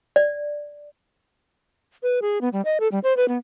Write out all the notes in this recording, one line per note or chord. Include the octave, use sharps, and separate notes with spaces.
D5
B4
G#4
B3
G3
D#5
A4
G3
C5
B4
B3